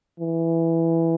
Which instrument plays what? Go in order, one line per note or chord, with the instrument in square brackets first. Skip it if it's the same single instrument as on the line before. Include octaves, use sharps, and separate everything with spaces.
[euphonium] E3